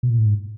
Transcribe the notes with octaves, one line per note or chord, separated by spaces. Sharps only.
B2
A#2
A2
G#2